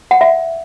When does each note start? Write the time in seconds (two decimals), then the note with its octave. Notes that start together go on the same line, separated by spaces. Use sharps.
0.11 F#5
0.21 E5